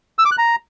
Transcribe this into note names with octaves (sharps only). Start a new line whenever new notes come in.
E6
D6
F#6
A#5